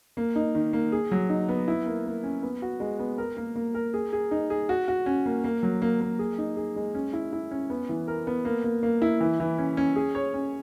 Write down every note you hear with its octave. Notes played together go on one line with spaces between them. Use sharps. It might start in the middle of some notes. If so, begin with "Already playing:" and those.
A#3
D#4
D#3
A#3
G#4
F#3
D#4
B3
E4
A#3
A#3
C#4
B3
F#4
G#3
B3
A#4
A#3
A#3
A#4
G#4
G#4
D#4
G#4
F#4
F#4
C#4
A#3
A#3
F#3
A#3
A#3
G#4
D#4
G#4
G#3
C#4
E4
E4
C#4
B3
E3
A#4
B3
A#3
A#3
A#3
E4
E3
E3
C#4
C#4
G#4
C#5
C#4